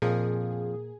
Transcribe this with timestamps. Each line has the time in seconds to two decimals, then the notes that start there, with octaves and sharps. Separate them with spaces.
0.02 F2 A#2 F3 G#4